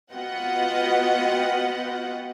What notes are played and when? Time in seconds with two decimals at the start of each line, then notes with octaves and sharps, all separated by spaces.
0.14 B3 F4 F#4 D#5 F#5 G5